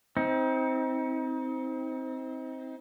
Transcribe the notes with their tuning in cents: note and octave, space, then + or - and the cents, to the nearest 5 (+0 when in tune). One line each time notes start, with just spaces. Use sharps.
C4 +0 D#4 +35